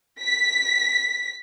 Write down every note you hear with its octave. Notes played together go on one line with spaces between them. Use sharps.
B6